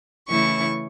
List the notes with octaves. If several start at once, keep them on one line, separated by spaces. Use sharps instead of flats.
C#3 E3 A3 C#4 E4 C#6